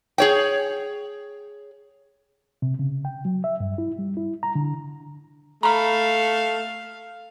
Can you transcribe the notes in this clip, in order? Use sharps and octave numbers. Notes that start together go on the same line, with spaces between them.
G#4 C#5 G5
C3
C#3
G5
F#3
E5
G2
E4
G3
E4
A#5
D3
A3 F5 A#5 B5